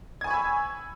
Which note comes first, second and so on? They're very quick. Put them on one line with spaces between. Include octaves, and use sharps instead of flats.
G#6 G#5 C#6 B5 E6